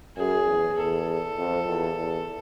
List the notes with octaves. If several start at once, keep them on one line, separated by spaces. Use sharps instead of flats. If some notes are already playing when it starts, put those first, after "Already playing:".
F#2 G#4
E2
E2 A4
F2
E2
E2